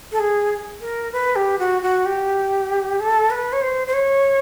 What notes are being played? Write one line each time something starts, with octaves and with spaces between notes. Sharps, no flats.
A4
G#4
A#4
B4
G4
F#4
F#4
G4
A4
B4
C#5
C5
C5
C#5